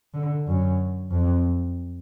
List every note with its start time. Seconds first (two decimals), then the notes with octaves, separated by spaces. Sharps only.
0.14 D3
0.47 F#2
1.11 F2